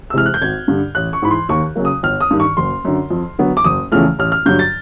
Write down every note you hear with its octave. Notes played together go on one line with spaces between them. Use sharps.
E6
C3 E3 G#3 F6
F#6
G6
G#1 G#6
G2 D3
A1 F#6
C#6
G#2 E3 B5
C6
D#2 C#6
C#3 F#3 A#3
D#6
G1 F6
D#6
G2 D#3
C#6
F#1 C6
F#2 D3
F2
D3 F#3 B3
D6
F#1 D#6
E2 C#3 F3 A3 F6
A1 F6
F6
G2 D3 F#3 G6
A6